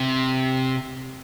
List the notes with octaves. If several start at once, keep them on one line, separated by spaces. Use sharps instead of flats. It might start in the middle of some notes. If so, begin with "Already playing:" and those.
Already playing: C3